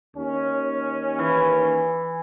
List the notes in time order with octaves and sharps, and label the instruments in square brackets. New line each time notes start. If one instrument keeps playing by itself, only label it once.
[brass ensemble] D#2 C#4
[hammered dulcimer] E3